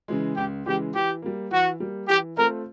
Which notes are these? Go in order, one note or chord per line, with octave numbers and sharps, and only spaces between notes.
C#3 E3 G#3
C#2 G4
C#3 E3 G#3 G4
E3 G4
G3 A#3
E3 F#4
G3 A#3
E3 G4
A3 C4 F4 A4 A#4